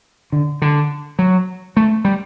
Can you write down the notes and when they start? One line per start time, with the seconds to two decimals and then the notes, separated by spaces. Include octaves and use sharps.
0.32 D3
0.62 D3
1.19 F#3
1.77 A3
2.05 G3